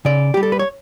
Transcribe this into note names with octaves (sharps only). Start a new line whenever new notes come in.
C#3 D5
G3 G4
A4
B4
C#5